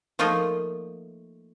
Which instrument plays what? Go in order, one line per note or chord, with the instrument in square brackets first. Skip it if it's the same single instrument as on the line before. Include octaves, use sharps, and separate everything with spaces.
[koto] F3 A3 A#3 D#4 F4